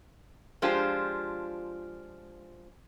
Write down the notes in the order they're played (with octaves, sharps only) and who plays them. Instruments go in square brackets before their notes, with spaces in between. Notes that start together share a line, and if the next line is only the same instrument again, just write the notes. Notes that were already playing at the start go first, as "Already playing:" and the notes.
[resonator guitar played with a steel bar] F3 G#3 D4 F4 G4 C5